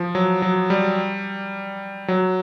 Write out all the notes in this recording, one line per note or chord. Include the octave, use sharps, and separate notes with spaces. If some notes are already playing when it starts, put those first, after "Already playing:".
Already playing: F3
F#3
F#3
G3
F#3